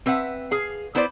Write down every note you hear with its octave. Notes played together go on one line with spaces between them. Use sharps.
C4 B4 E5 F#5
G#4 F5
B3 E4 B4 C5 D5